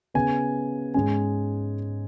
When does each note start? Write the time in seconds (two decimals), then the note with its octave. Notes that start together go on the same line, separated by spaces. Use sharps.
0.14 C#3 B3 G#5
0.94 G#2 G#3 C#4 G#5